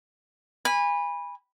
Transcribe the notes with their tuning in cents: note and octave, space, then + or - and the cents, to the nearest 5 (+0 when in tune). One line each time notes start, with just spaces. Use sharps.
G#5 -25 B5 -10